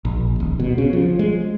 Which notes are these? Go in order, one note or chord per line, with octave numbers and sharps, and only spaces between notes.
A#1
D#1
B2
C#3
F3
G#3